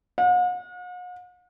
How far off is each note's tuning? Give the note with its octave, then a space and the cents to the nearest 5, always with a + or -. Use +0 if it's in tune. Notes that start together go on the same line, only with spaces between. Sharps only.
F#5 -45